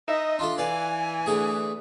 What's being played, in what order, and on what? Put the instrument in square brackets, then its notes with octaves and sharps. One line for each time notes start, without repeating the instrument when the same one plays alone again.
[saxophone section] D#4 E5 [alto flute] D#5
[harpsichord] D4 F4 A4 [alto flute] C6
[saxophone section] E3 B4 [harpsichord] D5 F5 [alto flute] G#5
[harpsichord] D3 A3 G#4